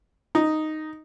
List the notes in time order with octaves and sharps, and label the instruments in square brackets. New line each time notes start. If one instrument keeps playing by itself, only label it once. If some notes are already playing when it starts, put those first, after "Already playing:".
[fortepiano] D#4